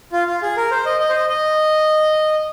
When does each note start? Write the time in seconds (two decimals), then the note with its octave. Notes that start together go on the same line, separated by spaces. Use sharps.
0.12 F4
0.27 F4
0.42 G#4
0.57 A#4
0.71 C5
0.86 D#5
1.00 D#5
1.09 C5
1.15 D#5
1.30 D#5